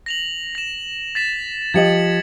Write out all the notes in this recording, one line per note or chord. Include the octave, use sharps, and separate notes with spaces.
A#6 F7 F#7
A#6 E7
A6 B6 E7
F3 G4 D#5 G#6 C#7 F#7